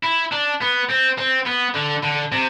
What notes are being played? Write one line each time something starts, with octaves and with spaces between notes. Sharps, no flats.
E4
D4
B3
C4
C4
B3
D3
D3
C3